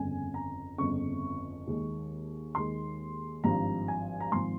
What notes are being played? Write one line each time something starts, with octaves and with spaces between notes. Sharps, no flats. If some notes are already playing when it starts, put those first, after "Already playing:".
Already playing: G1 F2 C#3 G#5
A#5
G1 F2 C#3 C#6
D#2 D#3 G#3
D#2 D#3 G#3 C6
G#1 G2 F3 A#5
G#5
A#5
G#1 F3 C6